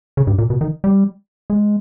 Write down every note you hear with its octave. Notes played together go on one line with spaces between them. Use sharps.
C#3
G2
A#2
B2
D#3
G3
G#3